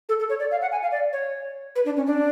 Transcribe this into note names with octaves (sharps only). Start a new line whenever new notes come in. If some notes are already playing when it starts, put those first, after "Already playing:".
A4
A4
C#5
D5
F5
F#5
G#5
F5
D5
C#5
B4
D4
C#4
D4